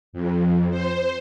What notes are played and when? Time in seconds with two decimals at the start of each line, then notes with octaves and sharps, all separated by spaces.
0.13 F2
0.70 C5